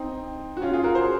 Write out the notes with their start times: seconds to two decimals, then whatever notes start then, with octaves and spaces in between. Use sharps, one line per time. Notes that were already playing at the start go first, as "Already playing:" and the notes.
Already playing: C4 D#4
0.57 F#4
0.62 C#4 F4
0.73 F4 G#4
0.84 F#4 A#4
0.95 G#4 C5